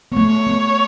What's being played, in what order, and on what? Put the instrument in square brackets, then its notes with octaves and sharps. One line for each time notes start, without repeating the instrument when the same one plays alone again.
[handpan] B3
[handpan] A3 [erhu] C#5
[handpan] B3